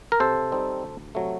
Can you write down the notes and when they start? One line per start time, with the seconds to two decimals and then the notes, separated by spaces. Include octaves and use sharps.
0.12 A#4
0.20 C3 A4 C5
0.52 G3 C4 D#4
0.83 D2
1.15 C3 F#3 A3